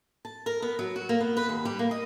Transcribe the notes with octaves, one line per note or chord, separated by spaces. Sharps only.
A5
A#4
B3
F#3
F#4
A#3
B3
B4
D#2
G3
A#3
D#5